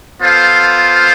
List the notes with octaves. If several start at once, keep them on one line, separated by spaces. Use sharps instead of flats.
B3 F4 A4 C5 F5